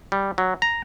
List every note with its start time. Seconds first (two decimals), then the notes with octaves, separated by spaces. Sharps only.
0.12 G3
0.38 F#3
0.62 A#5